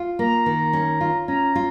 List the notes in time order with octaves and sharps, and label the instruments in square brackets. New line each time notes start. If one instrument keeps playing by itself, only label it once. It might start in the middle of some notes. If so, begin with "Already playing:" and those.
Already playing: [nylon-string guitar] F4
[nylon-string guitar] A#3 [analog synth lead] A#5
[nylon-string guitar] D#3
C#4
F4
[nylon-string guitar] C#4 [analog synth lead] A#5
[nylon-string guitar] F4